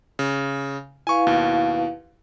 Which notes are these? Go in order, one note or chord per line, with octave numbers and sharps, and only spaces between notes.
C#3
E4 B4 F5 G#5 C#6
D#2 B2